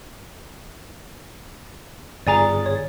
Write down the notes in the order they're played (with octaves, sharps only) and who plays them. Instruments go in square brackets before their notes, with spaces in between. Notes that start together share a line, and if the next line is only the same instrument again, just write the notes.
[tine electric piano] G1 G#4 A6 [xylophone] D5 G#5 A#5
[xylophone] C#5